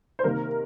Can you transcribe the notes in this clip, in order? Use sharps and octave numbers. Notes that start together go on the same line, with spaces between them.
C5
C3 D#3 A#3 A#4